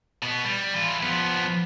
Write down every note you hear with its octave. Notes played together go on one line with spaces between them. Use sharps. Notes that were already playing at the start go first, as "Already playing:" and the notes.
B2 B3
G3
E3 F4
F3 B3